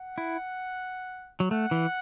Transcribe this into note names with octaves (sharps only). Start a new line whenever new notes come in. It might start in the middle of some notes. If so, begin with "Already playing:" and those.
Already playing: F#5
E4
F#3
A3 F#5
E3